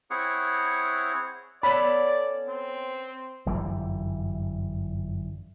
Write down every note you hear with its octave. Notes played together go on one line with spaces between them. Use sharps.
C4 E4 G#4 C#5 F#5
B3 C#4 A4 D5 B5
C4
G1 F#2 E3 G3